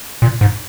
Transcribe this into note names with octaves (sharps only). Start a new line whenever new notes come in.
A#2
G#2